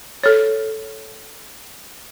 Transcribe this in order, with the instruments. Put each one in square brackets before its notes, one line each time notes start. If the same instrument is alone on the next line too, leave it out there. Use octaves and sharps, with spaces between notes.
[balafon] A4 C#5